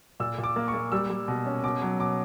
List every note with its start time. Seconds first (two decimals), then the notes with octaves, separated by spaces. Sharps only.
0.20 A#2 E6
0.38 A#2
0.44 D6
0.56 A#3
0.68 C#6
0.74 A#3
0.92 G3 E6
1.10 G3
1.28 B2
1.46 C#4
1.64 B2 D6
1.82 F#3
1.99 B2 D6